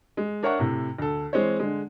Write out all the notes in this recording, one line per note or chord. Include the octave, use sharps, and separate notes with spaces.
G#3
D4 A#4 C#5 E5 F#5 C#6
A2 C3
D2 A4
E3 G#3 C4 C5 C#5
D3 G#3